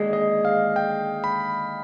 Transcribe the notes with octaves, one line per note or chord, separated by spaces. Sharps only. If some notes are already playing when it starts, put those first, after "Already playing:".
Already playing: D#2 D3 G#3 D#5
D#5
F5
G5
B5